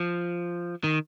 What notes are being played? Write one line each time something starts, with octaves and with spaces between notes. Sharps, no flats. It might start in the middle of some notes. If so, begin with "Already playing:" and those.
Already playing: F3
D#3